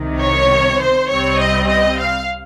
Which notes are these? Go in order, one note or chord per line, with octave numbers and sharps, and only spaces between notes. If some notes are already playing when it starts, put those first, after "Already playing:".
Already playing: C2 C3 D#3
C#5
C5
C2 C3 G3 C4 C#5
D#5
D#5
F5